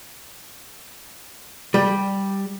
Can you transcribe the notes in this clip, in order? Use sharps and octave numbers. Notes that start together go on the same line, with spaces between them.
G3